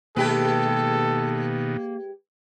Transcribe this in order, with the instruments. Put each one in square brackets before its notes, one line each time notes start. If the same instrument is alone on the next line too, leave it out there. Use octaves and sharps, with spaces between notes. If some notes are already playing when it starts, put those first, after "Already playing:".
[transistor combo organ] B2 D#3 [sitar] G#3 G4 B4 [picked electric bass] A#3 [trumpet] A4